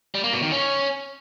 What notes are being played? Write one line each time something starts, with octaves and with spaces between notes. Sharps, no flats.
G3
A#3
B2
D#3
C#4